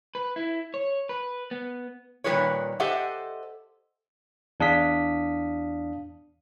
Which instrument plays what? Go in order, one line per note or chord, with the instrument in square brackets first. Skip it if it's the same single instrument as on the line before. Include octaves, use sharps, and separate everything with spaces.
[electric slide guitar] B4
E4
C#5
B4
B3
[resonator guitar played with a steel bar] A#2 D#3 G3 G#4 B4 C#5
G4 A4 C5 D#5 E5 F#5
[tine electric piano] E2 D4 F5 D#6 B6